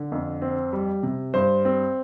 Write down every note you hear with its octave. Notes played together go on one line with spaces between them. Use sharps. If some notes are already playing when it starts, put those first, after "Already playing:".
Already playing: D3
F2
C4
G3
C3
G2 C5
C4